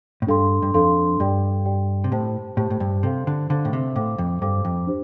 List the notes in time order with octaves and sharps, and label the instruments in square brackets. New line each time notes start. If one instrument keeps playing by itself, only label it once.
[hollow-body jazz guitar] A2
[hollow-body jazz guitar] G2 [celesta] D4 A4 F5 C6
[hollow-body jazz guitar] G2
[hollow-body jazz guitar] F2 [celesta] D4 A4 F5 C6
[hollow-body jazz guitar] G2 [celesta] G4 D5 G5
[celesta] G4 D5 G5
[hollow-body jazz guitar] C3
[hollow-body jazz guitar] A2 [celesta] G4 C5 A5
[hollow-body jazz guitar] A2 [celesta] G4 C5 A5
[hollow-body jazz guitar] A2
G2
[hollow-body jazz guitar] C3 [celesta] A4 C5 F5
[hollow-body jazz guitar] D3
[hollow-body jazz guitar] D3 [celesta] A4 C5 F5
[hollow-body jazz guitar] A2
C3
[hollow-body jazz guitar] A2 [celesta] A4 C5 F5 D6
[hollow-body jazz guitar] F2
[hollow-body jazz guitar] G2 [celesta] A4 C5 F5 D6
[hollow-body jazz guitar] F2
[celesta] D4 G4 C5